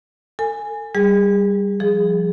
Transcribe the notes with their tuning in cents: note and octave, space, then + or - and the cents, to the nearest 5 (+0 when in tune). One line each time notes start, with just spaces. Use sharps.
A4 +30 G#5 +0
G3 +0 G#4 -35
F3 +0 G#4 +0